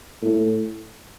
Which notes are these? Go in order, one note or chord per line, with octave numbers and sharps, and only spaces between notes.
A2